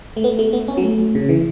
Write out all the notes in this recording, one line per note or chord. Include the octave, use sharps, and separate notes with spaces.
A3
B3
A3
B3
C#4
F#3
A3
C#3
E3